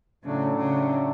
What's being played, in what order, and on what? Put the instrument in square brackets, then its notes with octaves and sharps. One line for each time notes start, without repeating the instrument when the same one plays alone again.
[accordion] A2 F#3 A3 D4 [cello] C#3
[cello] C#3